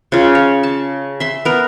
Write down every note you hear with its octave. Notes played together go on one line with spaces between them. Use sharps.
C#3 F4
C#5
A5
E5 C6
B3 A#4